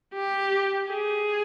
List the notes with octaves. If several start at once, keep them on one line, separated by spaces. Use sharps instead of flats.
G4
G#4